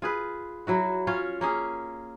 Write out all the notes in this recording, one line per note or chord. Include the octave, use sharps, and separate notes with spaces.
F4 G#4 B4
F#3 E4 F#4
C#4 F4 C#5
A#3 C#4 G#4